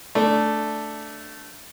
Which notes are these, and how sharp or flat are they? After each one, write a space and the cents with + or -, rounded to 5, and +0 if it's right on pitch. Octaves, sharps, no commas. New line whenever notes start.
A3 +0 D4 +0